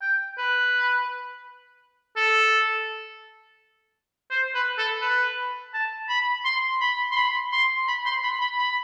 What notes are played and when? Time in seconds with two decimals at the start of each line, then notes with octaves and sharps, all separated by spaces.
0.02 G5
0.38 B4
2.16 A4
4.31 C5
4.54 B4
4.78 A4
5.02 B4
5.74 A5
6.09 B5
6.45 C6
6.81 B5
7.12 C6
7.17 B5
7.52 C6
7.88 B5
8.05 C6
8.23 B5
8.41 B5
8.59 B5